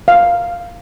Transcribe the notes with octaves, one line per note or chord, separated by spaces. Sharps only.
F5